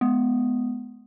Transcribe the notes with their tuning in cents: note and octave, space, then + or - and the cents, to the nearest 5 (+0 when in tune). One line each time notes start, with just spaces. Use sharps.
G#3 +30 B3 +10